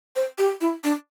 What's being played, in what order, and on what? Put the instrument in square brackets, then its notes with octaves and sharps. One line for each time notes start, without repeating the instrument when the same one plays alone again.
[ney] C5
G4
E4
D4